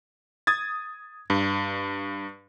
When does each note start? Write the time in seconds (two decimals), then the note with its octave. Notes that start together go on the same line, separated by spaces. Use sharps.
0.47 D#6 G#6 A6
1.30 G2